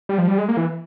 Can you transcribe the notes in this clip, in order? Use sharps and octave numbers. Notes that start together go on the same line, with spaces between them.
G3
F3
G3
G#3
A#3
E3